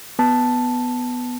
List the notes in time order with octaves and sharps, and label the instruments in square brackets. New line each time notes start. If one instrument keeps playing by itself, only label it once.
[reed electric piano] B3 A5